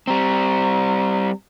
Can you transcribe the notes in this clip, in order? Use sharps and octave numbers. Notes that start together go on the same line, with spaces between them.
G3 C4 A#5